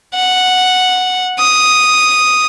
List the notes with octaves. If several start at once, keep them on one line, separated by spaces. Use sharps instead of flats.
F#5
D#6